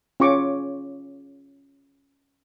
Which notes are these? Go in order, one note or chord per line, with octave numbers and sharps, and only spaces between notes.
C#4 F4 G#4 C#5 C#6 D6